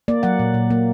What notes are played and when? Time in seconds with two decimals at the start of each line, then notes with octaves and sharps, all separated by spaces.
0.08 A#3 D5
0.23 F#3 F#5
0.39 A#2
0.54 A#2
0.70 A#3